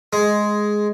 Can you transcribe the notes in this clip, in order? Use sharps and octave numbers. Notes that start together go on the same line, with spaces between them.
G#3